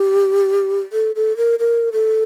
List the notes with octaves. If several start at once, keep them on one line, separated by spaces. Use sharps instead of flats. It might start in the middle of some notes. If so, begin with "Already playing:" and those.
Already playing: G4
A4
A4
A#4
A#4
A4